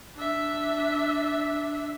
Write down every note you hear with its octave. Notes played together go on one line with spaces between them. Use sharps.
D4 E5